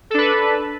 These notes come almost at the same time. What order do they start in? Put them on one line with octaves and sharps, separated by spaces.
A4 D4 B4